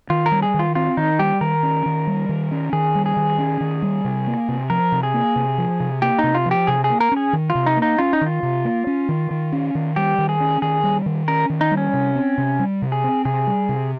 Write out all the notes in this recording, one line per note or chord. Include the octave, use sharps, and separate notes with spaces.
D#3 F4
A#4
G3
G#4
D#3
F4
C4 F4
D#3 D#4
G3 G4
D#3 A#4
C#4
D#3
G3
D#3
C#4
D#3 G#4
G3
G#4
D#3
C#4
D#3
G3
C3
A#3
C3
F3 A#4
C3
G#4
A#3
C3
F3
C3
A#3 G4
D#4
C3
F4
F3
G4
C3 G#4
G#4
A#3
A#4
C#4 G#4
D#3
F4
C3
D#4
A#3
D#4
C#4 F4
D#4
D#3
F4
C3
A#3
C#4
D#3
D#3
C#4
D#3
G3 G4
D#3
G#4
C#4
D#3 G#4
G3
D#3
C#4 A#4
D#3
D#4
G3
C#4
C3
C4
C3
G3
C3
G#4
C4
C3 G#4
G3
C3